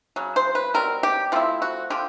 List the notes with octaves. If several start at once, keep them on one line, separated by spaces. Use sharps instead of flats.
C#3 F#3
C5
B4
B2 G3 C4 A#4
G4
F3 A3 C4 E4 F4
F#4
D3 F3 G4